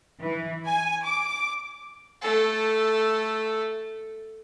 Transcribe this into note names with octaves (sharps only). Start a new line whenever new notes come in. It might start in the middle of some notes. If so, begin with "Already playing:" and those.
E3
G#5
D6
A3 A4